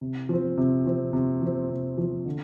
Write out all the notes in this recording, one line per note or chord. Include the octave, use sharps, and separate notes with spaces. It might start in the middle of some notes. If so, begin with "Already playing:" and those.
C3
F3 C4
C3
F3 C4
C3
F3 C4
C3
F3 C4
D3